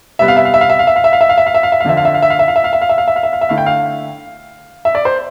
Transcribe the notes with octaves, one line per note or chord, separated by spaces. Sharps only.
C3 G3 B3 E5
F5
E5
F5
E5
F5
E5
F5
E5
F5
E5
F5
E5
F5
E5
F5
E5
F5
E5
F5
F2 D3 F3 E5
F5
E5
F5
E5
F5
E5
F5
E5
F5
E5
F5
E5
F5
E5
F5
E5
F5
E5
D3 A3 E4 F5
G5
F5
E5
D5
C5